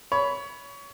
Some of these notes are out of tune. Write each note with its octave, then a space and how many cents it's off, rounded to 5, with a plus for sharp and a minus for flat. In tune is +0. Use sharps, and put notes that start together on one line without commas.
C#5 +25 B5 +0